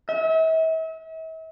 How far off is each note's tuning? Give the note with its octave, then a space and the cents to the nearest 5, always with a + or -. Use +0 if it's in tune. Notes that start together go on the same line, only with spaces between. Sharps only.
E5 -40